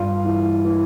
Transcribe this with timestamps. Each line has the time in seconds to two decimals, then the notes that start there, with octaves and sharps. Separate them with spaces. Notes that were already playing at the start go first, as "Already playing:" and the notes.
Already playing: G2 F4
0.24 E3
0.65 E3